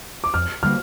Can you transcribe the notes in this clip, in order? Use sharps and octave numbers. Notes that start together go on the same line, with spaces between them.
D6
F2 F6
D3 G3 A#3 F6